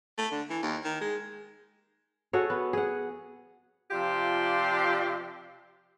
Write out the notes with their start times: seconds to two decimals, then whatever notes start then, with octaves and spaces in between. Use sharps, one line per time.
0.18 A3
0.31 D3
0.50 E3
0.63 D#2
0.84 D#3
1.01 G#3
2.33 F#4 G#4 A4 C#5
2.50 B3
2.73 G#4 F#5
3.91 C3 F3 F4 G4 D5 C6